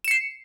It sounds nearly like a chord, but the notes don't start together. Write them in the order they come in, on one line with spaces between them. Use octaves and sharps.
E7 C#7 C7